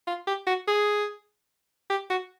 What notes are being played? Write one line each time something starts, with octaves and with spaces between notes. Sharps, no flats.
F4
G4
F#4
G#4
G4
F#4